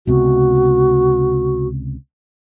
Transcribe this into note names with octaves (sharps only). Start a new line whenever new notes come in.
C#2 C3 B3 F#4